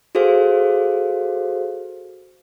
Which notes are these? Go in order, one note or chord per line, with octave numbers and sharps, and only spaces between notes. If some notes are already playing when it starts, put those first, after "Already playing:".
F#4 G#4 A4 C5 F5